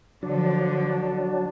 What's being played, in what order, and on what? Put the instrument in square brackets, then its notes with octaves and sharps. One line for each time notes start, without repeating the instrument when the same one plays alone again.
[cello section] D3 F3 [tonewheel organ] F#3 D4